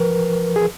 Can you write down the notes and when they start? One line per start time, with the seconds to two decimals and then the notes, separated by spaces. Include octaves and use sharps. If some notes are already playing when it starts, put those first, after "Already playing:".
Already playing: F3 A#4 B4
0.56 G#4